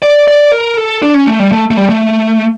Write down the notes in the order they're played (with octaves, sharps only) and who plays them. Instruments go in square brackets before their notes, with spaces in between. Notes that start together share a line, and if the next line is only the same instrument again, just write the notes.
[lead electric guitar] D5
D5
A#4
A4
D4
C#4
A3
G3
A3
A3
G3
A3